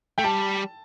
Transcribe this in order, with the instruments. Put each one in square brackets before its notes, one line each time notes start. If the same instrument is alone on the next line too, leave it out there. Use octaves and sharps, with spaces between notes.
[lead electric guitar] A3 [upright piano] G5
[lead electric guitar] G3 [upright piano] A5